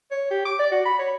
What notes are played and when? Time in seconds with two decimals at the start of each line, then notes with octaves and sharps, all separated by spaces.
0.11 C#5
0.31 G4
0.45 D6
0.59 D5
0.72 F#4
0.86 B5
0.99 C#5